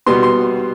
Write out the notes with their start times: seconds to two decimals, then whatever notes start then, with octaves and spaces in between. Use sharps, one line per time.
0.06 B2 G3 B3 C6
0.23 C6